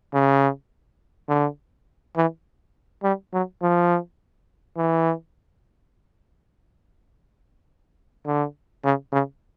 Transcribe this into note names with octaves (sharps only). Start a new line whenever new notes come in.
C#3
D3
E3
G3
F#3
F3
E3
D3
C#3
C#3